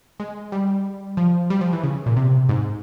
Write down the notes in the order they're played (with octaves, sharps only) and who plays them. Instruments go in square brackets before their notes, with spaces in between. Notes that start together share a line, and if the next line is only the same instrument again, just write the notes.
[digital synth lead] G#3
G3
F3
G3
F3
E3
C#3
A#2
C3
G#2